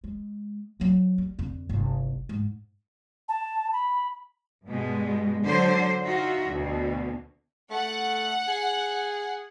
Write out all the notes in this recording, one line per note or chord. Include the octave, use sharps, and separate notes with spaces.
G#3
F3 F#3
G3
F2 D3
G1 C2
G#2
A5
B5
G2 B2 G#3
D3 F#3 C5
D#4 F4 F#4 E5
D2 B2
A3 F#5
G#4